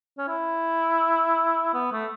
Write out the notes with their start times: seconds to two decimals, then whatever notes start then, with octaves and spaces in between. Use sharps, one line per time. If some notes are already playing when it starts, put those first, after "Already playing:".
0.18 C#4
0.28 E4
1.74 B3
1.92 A3